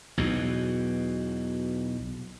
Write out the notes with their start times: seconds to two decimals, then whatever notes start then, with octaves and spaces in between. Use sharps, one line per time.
0.17 B1 E2 B2